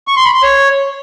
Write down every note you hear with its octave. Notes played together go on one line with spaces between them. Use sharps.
C#6
C6
B5
C6
C#5